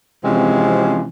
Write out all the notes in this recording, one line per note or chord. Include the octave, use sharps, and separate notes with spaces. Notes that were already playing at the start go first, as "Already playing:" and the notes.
C3 E3 F3 G#3 C4 C#4